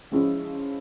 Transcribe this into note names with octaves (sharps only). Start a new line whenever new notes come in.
C#3 F3 G#3 C#4 E4